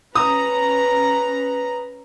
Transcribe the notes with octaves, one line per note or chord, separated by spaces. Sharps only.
C#4 B4 A#5 D#6